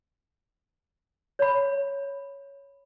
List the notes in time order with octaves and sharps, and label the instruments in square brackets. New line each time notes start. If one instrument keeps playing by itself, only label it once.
[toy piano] C#5 B5